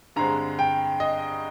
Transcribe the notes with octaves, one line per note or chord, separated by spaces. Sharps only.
G2 D3 G#3 C4 A#5
G5
D#5